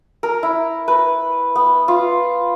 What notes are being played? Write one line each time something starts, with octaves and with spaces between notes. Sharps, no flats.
A#4
E4
B4
B3
F4